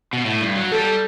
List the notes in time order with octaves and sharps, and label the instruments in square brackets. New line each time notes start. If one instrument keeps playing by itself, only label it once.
[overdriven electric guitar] B2
A2
G2
F#3
[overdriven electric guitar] G3 [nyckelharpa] A4